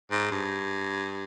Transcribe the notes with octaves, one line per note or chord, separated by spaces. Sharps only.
G#2
G2